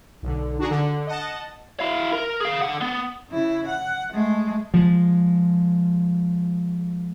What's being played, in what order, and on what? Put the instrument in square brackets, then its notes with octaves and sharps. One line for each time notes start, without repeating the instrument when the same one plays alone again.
[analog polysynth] B1 D3
D4 F#4 G#4 A#5
D3
D#5 F#5 A5
[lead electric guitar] E4 F5
A#4
G#4 F5
D3 F#5
B3
[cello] C#3 E4
F#5
G#3 A3
[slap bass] F3 G#3